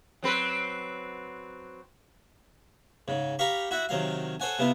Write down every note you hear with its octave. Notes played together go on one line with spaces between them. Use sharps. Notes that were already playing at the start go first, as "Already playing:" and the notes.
F#3 C4 B4
G#2 C#3
G4 A#4 F5 B5 C#6
E4 F#4 E5 F#5
C3 D#3 F#3 F5
A4 C5 C#5 F#5 G#5
C3 B3 E4 F4